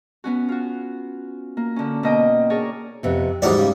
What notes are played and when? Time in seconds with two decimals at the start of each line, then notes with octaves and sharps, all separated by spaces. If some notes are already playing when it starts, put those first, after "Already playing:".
0.24 B3 C#4 F#4
0.49 F4 F#4
1.57 A#3
1.76 D3 C#4
2.03 B2 A#3 D#5 G5
2.50 D4 G#4 A#4 C#5 D5
3.03 F2 C3 B3
3.42 G#2 E3 G3 F#4 C#5 D5
3.58 C#3